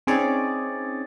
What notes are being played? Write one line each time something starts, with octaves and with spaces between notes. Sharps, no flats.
C4 C#4 D#4 G#4 C#5 D5